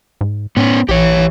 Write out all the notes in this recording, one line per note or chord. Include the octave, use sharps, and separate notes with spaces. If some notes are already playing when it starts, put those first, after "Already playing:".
G#2
A2 B3 C#4
A#1 E3 G4 C#5